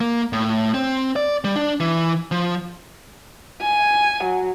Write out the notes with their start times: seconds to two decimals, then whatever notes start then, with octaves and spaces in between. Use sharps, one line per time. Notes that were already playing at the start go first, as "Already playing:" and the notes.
0.01 A#3
0.33 A2
0.74 C4
1.16 D5
1.44 G3
1.56 D4
1.80 E3
2.31 F3
3.62 G#5
4.24 F#3